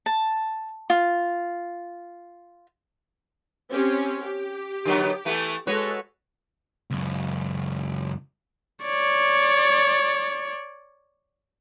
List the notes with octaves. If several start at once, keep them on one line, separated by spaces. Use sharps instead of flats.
A5
F4
C4 C#4 G4
G4
D3 F#3 B3
E3 A3 B3
G#3 F#4 A4 B4 C#5
C#2 F#2
C#5 D5